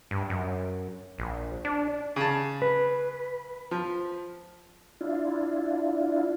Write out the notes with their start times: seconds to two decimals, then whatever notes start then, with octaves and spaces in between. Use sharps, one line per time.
0.11 G2
0.30 F#2
1.18 A#1
1.65 D4
2.16 C#3 A5
2.62 B4
3.71 F3
5.01 D4 E4 F4